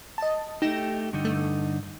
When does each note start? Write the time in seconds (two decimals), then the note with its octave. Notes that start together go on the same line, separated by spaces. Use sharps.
0.18 D#5 A5
0.62 A3 D#4 G4 A#6 E7
1.13 G2 D3 D#4
1.25 A3